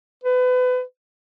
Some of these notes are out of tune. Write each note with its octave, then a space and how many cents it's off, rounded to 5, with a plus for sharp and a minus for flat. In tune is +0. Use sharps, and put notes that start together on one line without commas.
B4 +30